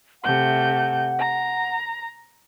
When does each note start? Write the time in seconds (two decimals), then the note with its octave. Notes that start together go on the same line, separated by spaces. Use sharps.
0.24 C3 A3 F#5 G6
1.19 A#5